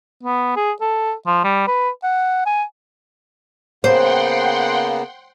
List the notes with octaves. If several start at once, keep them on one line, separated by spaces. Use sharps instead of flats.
B3
G#4
A4
F3
G3
B4
F#5
G#5
C#3 A#3 B3 C5 F#5 G5 C6